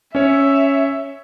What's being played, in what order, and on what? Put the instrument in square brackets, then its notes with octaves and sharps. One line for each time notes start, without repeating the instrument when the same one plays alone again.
[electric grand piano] C#4 C#5 [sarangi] E5